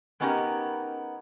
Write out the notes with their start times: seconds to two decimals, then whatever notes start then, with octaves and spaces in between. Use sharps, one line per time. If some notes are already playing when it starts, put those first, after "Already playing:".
0.20 G#3 B3 C#4 D#4 G4 A#4